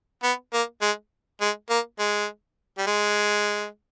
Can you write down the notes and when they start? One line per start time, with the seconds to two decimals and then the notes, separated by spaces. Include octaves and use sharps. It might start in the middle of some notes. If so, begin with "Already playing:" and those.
0.23 B3
0.53 A#3
0.82 G#3
1.41 G#3
1.70 A#3
1.99 G#3
2.78 G3
2.87 G#3